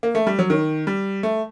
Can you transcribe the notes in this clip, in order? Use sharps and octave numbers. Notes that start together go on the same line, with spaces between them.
A#3
A3
G3
F#3
D#3
G3
A3